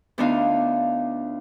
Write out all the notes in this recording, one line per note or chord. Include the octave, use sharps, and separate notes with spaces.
D2 B3 D4 D#4 F4 F5